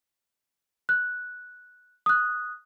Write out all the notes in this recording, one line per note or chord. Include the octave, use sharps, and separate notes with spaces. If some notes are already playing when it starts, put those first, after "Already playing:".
F#6
D#6 F#6